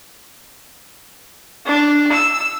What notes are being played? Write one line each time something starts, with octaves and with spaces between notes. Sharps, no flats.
D4
E6